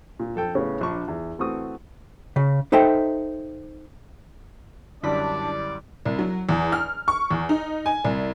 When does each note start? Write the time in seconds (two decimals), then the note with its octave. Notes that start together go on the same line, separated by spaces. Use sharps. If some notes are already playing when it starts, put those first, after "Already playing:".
0.20 A#2
0.36 F2 A4 G5
0.55 A2 C#3 B3 C#4
0.81 A#1 D4 C#6
1.08 E2
1.39 E3 A3 C4 F#4 C#6 D#6
2.36 C#3
2.72 D#4 A4 C5 E5 G5
5.03 F#2 D3 G3 D4 E4 D5 B5
6.05 C2
6.19 F#3
6.49 E2
6.72 F6
7.08 C#6
7.31 E2
7.49 D#4
7.86 G#5
8.04 C2